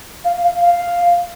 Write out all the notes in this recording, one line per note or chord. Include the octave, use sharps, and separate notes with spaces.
F5
F5
F5